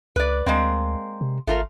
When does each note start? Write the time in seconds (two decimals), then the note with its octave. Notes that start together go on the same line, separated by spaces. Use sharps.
0.16 C#2 B4 D5
0.46 D2 G#3 A#3 C4
1.21 C3
1.47 G#1 A3 F4 A#4